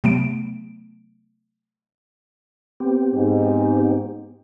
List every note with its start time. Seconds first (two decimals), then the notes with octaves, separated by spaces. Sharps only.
0.04 C3 F#3 A3 B3 D7
2.80 B3 C4 G4
3.15 G#2